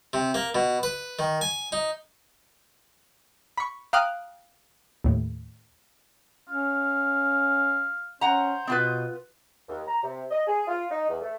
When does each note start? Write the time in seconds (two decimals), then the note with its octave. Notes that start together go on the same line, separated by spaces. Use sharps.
0.13 C3
0.34 A#3
0.55 B2
0.83 B4
1.19 D#3
1.41 G#5
1.72 D#4
3.58 B5 C#6
3.93 F5 G5 A#5 D6 D#6 F#6
5.04 D#2 A2
6.48 C#4 F5
8.21 C#4 C5 F#5 A#5
8.67 B2 B3 F4 B4
9.68 D#2
9.86 A#5
10.03 C3
10.31 D#5
10.47 G#4
10.67 F4
10.90 D#4
11.09 E2
11.21 A3